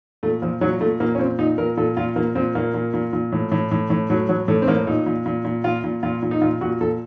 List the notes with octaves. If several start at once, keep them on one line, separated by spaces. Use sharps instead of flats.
A#2 A3
A#2 F3
A#2 F#3
A#2 A3
A#2 A#3
C#4
A#2 C4
A#2 D#4
A#2 A#4
A#2 A4
A#2 F4
A#2 A#3
A#2 C4
A#2 A#3
A#2
A#2
A#2
A2
A2
A2
A2
A2 F#3
A2 F#3
A2 A3
C4
A2 A#3
A#2 D#4
A#2
A#2
A#2
A#2 F4
A#2
A#2 F4
A#2
D#4
A#2 F4
A#2 F#4
A#2 A4